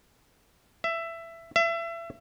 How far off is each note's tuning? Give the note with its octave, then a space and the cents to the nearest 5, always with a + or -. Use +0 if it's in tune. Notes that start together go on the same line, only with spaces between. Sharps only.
E5 +15
E5 +30